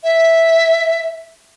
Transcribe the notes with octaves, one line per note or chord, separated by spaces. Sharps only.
E5